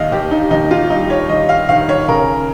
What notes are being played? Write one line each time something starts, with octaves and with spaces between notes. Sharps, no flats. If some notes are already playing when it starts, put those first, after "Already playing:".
Already playing: D#2 D#3 D#5 F5
D#2 G4
D#4
D#2 D#4
F4
G3 D#4
C#5
D#3 D#5
F5
D#3 F5
C#5
C#3 A#4